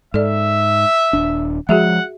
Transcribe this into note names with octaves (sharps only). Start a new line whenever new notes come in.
G#2 A4 D5 E5
D#1 D4
F3 G#3 F#4 G#4 E5 F#5